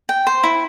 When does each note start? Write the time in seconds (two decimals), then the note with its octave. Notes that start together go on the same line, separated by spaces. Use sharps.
0.09 G5
0.27 C5
0.44 E4